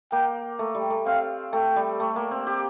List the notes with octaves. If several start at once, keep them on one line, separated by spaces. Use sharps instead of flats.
A#3 G5
A3
G3
A3
C4 F5
A3 G5
G3
A3
A#3
C4
G4